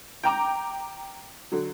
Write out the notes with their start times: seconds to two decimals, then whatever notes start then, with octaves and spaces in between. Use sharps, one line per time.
0.23 G5 A#5 D6
1.52 D3 F#3